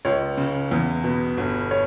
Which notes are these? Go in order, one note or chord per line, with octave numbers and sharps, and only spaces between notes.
C#2 C#5
C#3
E2
B2
G1
C#5